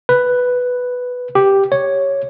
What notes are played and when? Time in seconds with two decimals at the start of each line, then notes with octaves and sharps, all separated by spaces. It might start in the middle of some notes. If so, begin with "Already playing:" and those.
0.09 B4
1.35 G4
1.72 C#5